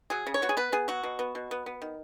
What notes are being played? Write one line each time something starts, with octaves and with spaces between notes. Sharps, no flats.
F#3 G#4
C#3
C#5
B3 F#4
G#4
B3 B4
B3 G#4
F#3 F#4
B2
B3
B2
B3
B3
D#3